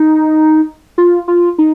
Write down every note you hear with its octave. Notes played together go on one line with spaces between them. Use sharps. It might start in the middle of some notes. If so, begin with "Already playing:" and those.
Already playing: D#4
F4
F4
D#4